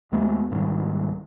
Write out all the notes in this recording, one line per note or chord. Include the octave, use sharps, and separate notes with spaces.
D#2 G#3 A3 B3
C2 G#2 D#3 G3